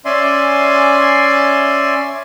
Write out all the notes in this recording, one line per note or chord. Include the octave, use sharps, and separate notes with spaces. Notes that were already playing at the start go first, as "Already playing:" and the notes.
C#4 D5 E5 G#5 C6